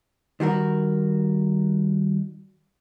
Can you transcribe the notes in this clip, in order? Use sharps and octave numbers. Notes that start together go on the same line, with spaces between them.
D#3 G3 F#4 A#4